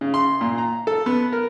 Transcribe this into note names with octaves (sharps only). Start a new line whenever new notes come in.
C#3
C6
A#2
A#5
A4
B3
A#4